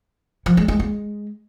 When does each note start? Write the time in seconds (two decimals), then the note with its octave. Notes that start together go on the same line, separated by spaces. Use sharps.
0.46 F3
0.57 G#3
0.68 G#3
0.79 G#3